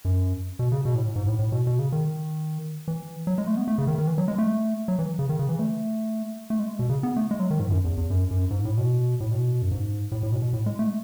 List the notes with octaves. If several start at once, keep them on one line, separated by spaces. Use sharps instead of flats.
F#2
B2
C#3
B2
A2
G#2
A2
A2
B2
B2
C#3
D#3
E3
F#3
G#3
A3
B3
A3
C#3
D#3
D#3
E3
F#3
G#3
A3
F#3
E3
C#3
D#3
C#3
E3
A3
A3
G#3
B2
C#3
B3
A3
G#3
F#3
D#3
G#2
F#2
E2
E2
F#2
F#2
G#2
A2
B2
A2
B2
F#2
G#2
A2
A2
B2
B2
A2
G#3
A3